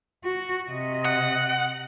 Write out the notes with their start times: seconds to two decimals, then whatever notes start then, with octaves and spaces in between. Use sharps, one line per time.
0.24 F#4
0.70 C3 D#5
1.05 F#5